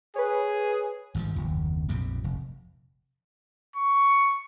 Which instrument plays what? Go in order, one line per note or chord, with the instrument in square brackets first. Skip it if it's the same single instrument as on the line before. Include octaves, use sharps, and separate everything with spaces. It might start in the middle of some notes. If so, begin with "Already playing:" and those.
[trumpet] G#4 [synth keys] B4 C#5
[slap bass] G#1 G2 C3 F3
F#1 D#2
A#1 F2 C3
F1
[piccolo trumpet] C#6